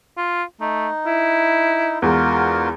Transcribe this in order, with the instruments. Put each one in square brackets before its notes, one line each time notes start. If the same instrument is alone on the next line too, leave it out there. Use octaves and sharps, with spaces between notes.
[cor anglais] F4
[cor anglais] A3 [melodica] D#4
[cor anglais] E4
[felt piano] E2 G#3 [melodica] F4 F#4 A#4